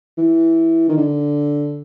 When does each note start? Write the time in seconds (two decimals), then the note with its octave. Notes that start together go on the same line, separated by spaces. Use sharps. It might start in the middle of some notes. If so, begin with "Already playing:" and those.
0.18 E3
0.89 D#3
0.97 D3